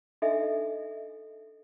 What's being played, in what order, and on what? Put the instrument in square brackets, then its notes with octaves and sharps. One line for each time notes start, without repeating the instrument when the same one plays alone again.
[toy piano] D4 D#4 A4 D#5 E5 G#5